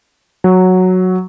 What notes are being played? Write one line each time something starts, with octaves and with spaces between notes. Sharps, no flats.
F#3